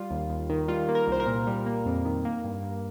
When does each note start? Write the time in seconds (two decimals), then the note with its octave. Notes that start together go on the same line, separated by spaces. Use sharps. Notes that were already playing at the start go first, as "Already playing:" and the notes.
Already playing: G3 F4
0.11 D#2
0.29 D#2
0.50 D#3
0.68 G3 F4
0.88 A#3
0.95 A#4
1.07 C2 C5
1.20 A#4
1.26 A#2
1.47 G3
1.66 A#3
1.86 F2
2.05 D#3
2.25 A#3
2.44 G2
2.63 G2